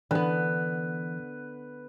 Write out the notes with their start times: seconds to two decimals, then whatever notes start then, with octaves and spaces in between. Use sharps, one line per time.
0.11 D3 E3 B3 B4